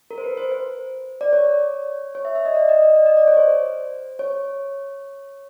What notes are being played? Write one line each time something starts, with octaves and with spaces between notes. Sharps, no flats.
A#4
C5
B4
C5
C5
D5
C#5
C#5
E5
E5
D#5
D5
D#5
D#5
D5
D#5
D5
C#5
C5
C#5